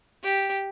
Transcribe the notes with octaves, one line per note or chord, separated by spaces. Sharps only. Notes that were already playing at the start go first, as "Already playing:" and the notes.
G4